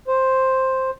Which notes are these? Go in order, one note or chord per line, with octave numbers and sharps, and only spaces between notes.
C5